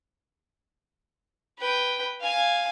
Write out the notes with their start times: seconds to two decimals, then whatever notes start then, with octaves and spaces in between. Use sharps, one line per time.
1.58 B4 G5
2.21 F5 G#5